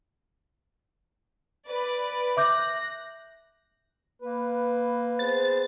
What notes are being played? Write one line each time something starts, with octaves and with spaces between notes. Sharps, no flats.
B4 D5
E5 D6 F#6 G6 A#6
A#3 B4
B3 G#4 C5 A6